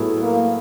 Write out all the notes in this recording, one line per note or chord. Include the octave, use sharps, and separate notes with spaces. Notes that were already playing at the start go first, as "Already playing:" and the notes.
Already playing: A2 F#3 B3 E4 G#4
A#3